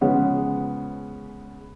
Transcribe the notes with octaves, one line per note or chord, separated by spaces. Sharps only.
C#3 F3 G#3 B3 C#4